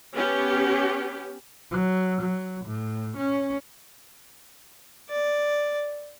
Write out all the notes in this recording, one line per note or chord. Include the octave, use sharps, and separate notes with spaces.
B3 C#4 G4
F#3
F#3
A2
C#4
D5